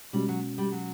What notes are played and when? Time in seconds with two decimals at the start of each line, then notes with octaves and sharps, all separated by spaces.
0.13 B2 G3 G#3 C#4 F#4
0.28 F#3
0.58 G3
0.72 F#3